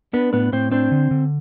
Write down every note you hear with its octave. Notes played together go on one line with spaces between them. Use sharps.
B3 D4 B4
A2 B3 B4
A2 C4 C5
C4 D4 C5
D3
D3